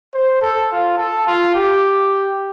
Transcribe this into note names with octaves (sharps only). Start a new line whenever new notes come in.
C5
A4
F4
A4
F4
G4